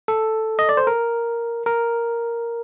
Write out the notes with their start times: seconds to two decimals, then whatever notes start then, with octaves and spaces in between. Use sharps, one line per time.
0.08 A4
0.59 D#5
0.69 D5
0.77 C5
0.87 A#4
1.66 A#4